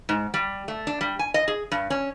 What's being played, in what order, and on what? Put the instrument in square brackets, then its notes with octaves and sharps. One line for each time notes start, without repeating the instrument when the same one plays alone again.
[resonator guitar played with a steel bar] G#2
G3
A3
D4
G3
G#5
D#5
G#4
G2
C#4